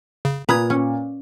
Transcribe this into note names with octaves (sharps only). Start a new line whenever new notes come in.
C#3
A#2 B4 A#5 D#6 G#6
C#4